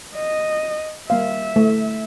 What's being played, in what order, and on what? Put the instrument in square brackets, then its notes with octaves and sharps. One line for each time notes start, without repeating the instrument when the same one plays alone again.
[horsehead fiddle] D#5
[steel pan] G3 A#3 F5 [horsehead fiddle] E5
[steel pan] A3